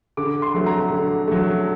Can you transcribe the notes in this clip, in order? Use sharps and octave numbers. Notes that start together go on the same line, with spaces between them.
D3 D6
C6
F#3 A3
A#5
D3
F#3 A3